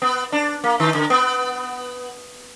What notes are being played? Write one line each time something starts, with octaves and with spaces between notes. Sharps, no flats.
B3
D4
A#3
D#3
D3
B3